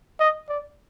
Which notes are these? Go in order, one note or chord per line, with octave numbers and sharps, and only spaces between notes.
D#5
D5